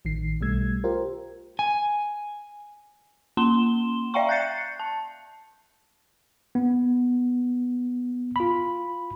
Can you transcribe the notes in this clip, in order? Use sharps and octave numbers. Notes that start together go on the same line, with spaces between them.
A1 D#3 C7
B1 B2 G3 A3 E6 G#6
F4 G4 A#4 C5
G#5
A#3 C#4 C6 E7 G7
D5 E5 F5 G5 A#5 C#6
F#6 G6 A6 C7 C#7
A5
B3
F4 B5